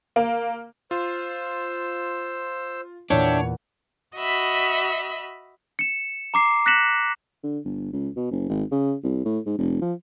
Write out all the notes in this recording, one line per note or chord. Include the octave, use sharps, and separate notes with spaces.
A#3
F4 C5 E6
E2 A#2 D4 C#5 E5 G5
F#4 D#5 E5 B5
C#7 E7
A#5 D6 C7
F#6 A#6 B6 C#7 E7 F#7
D3
G1
C#2
B2
F#1
G#1
C#3
C2
A2
G#2
F1
F3